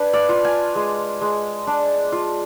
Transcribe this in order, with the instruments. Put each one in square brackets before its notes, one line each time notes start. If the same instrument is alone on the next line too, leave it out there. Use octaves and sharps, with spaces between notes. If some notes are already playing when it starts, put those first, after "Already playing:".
Already playing: [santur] D4 B4
D5 F5
F4
F5 G#5
G#3
G#3
D4
F4